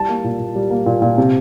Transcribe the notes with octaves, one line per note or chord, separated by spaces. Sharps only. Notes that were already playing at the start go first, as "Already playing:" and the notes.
Already playing: G3 A5
A#3
A#2
A#2
G3
A#3
A#2
A#2
C3